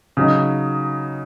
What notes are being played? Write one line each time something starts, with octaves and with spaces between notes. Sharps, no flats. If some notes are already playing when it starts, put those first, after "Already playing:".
C#3 F#3 D#4